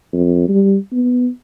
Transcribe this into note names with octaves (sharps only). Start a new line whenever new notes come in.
F2
G3
B3